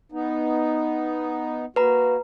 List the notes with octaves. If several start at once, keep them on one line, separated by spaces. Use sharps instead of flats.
B3 D#4
A#3 F#4 B4 A#5